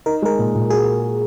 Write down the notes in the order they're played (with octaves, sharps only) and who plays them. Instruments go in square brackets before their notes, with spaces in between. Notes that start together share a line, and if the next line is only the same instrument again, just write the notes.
[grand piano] D#4 [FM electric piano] A#4
[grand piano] G#3 [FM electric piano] A#4
[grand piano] A#2
A#2
[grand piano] F#4 [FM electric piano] G#4